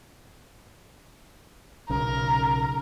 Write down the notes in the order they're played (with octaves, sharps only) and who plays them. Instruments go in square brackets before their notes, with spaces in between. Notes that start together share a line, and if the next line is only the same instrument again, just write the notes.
[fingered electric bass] B1 C#3 [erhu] A#4